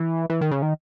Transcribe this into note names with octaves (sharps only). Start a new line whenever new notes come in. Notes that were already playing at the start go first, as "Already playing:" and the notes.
Already playing: E3
E3
D#3
C#3
D#3